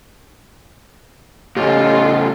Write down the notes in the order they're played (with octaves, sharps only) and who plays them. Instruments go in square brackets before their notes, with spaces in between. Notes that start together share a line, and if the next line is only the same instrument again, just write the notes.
[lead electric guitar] A2 C#3 [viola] F4 A4 [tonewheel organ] G4 [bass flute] D#5